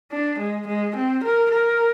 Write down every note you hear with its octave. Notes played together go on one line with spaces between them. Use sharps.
D4
G#3
G#3
C4
A#4
A#4